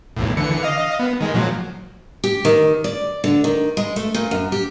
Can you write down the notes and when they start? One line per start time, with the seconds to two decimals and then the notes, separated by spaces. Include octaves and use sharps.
0.17 B1 E2 A2
0.37 D3 E3 C#7
0.63 D#5 F5
0.99 B3
1.21 D#3 G#3
1.34 A#2 F3 F#3
2.24 G4
2.45 D#3
2.84 D5
3.24 D3
3.44 D#3
3.77 G#3
3.96 A3
4.14 A#2
4.31 F#2
4.52 G4